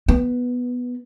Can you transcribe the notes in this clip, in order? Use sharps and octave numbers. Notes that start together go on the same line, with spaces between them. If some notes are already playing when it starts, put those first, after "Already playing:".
B3